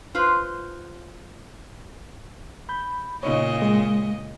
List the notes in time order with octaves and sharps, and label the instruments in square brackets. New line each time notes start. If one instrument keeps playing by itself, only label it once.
[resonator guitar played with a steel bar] F4 B4 C5
[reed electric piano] B5 G6
[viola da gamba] A#2 C#3 D#5 [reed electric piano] D#4 C#5
[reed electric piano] G#3